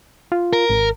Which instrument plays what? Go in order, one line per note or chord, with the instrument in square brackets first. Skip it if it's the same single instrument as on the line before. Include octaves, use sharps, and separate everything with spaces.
[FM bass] F4
[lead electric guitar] A#4
[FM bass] G#1